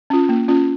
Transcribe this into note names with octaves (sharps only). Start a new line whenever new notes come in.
C#4 F4
A#3
C#4 F4